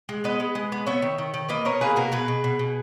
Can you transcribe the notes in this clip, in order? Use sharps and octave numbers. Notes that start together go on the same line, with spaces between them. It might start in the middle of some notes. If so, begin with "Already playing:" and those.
G#3
B3 B4 D#5
G#3
G#3
B3
B3 C#5 E5
D#3
D#3
D#3
A#3 B4 D#5
B2 A#4 C#5
A#3 G#4 B4
B2 F#4 A#4
B2 G#4 B4
B2
B2
B2